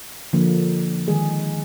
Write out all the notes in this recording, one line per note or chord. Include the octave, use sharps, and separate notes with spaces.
D3 F3 A#3
D#3 G#3 G#4